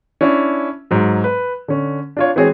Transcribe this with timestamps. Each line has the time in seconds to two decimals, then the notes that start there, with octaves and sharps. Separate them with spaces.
0.21 C#4 D4 E4 E5
0.91 G#2 F#3
1.24 B4
1.68 D3 C#4
2.17 D4 F4 C#5
2.36 E3 G#3 C4 F#4 G#4 C#5